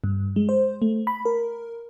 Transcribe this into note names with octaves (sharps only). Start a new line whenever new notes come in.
G2
G#3
C5
A3
B5
A#4